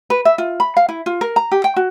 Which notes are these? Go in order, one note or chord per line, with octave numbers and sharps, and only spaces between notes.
B4
E5
F4
B5
F5
E4
F4
A#4
A#5
G4
G5
F#4